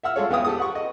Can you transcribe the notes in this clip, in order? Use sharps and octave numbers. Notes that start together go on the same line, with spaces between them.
E5 F#5 E6 F6
G#3 F4 A4 C#5
E2 B3 F5 G5 D#6
G4 A4 D#6
B4 F#5 C#6
D#5